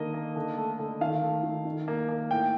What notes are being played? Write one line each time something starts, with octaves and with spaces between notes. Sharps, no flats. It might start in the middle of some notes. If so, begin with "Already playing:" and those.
Already playing: D3 D#3 A#3 D#5
A#3
D3
A3
D3
D#3 F5
A3
D#3
D#3
A#3
A#3
A2 G5